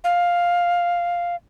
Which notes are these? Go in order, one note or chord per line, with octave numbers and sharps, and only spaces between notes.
F5